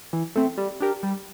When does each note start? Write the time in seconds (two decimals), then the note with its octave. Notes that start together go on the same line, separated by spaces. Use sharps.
0.13 E3
0.36 A3 C4
0.58 G3
0.80 D4 G4 A#4
1.03 G3